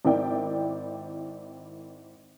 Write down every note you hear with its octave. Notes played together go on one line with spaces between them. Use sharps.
G#1 E4 A#4 D5 G5